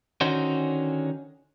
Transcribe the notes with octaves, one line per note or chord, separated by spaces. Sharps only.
D3 D#3 C#4 D#4 F#4 C5